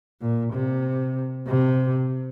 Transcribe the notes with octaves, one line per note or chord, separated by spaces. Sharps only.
A#2
C3
C3